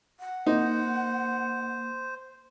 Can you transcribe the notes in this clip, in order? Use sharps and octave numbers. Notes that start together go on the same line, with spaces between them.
F#5
A#3 D#4 C5